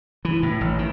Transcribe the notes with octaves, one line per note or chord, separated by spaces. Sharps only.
E3
A2
A1
D#3